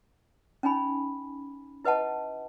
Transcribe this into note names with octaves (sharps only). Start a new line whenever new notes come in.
C#4 D#4 G#5 B5
E4 B4 D#5 F#5 A5